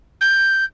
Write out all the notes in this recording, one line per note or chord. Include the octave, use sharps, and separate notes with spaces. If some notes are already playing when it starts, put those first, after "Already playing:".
G6